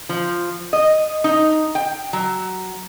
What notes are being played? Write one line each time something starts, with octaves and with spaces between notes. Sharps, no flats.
F3
D#5
D#4
G5
F#3